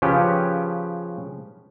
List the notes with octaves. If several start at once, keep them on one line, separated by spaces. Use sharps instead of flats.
C#3 F3 C#4 G4 B4